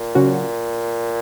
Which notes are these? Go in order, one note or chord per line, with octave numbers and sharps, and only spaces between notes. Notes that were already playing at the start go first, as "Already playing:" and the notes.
Already playing: A#2
C#3 F#3 C#4 F#4